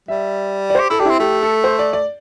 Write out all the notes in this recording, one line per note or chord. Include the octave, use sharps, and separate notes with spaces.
G3 E5
D5
G4 C5
E4 A4
D4 G4
C4 E4
A3 G4
A4
C5
D5
D5